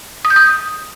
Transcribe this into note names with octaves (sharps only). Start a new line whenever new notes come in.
D#6
G6
D#6